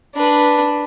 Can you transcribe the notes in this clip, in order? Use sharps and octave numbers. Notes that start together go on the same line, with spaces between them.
D4 B4